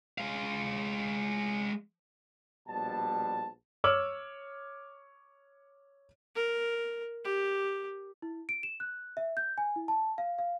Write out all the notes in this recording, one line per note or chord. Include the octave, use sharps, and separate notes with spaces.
G#3 F5
A#1 B2 G3 A5
C#5 D6 E6 F6 F#7
A#4
G4
E4
D7
E7
F#6
E5
G6
G#5
E4
A5
F5
F5